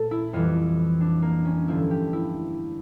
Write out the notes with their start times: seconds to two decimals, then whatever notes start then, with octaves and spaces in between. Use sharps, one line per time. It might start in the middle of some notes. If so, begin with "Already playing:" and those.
Already playing: A#2 A3 A4
0.11 E4
0.33 F2 E3 G3 F4
1.01 D4
1.22 A#3
1.45 C#4
1.68 G2 D3 F3 A3 E4
1.91 G4
2.13 E4